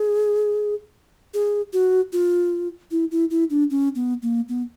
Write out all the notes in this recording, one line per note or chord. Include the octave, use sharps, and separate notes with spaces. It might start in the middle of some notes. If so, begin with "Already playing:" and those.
Already playing: G#4
G#4
F#4
F4
E4
E4
E4
D4
C#4
B3
A#3
B3